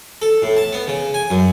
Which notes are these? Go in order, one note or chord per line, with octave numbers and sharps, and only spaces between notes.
A4
A2
A5
B3
C#3
G#5
F#2